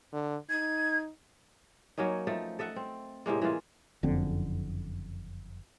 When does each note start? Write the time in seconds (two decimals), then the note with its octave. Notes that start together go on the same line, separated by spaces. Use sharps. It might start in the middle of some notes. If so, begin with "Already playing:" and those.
0.13 D3
0.50 D#4 G#6
1.98 F#3 A#3 C#4 D#4
2.27 F3 A3 D#4
2.59 A4 D#5 E5 F#5
2.76 C4
3.26 A2 C3 G#3 A#3
3.42 E3 G#3 A#3 F4
4.03 F#1 F2 D3 C4